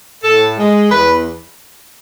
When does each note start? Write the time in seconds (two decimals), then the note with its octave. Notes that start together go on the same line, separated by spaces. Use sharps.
0.24 A2 A4
0.58 G#3
0.91 E2 B4